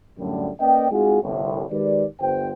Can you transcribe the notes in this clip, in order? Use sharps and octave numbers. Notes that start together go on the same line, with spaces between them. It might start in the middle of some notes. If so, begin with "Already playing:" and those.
F#2 A2 D3 G3
A#3 C#4 B4 D5 D#5 G5
G#3 C4 D#4 F4 F#4 G#4
G1 C2 A2
D#3 G#3 G4 B4 D5
G1 C5 G5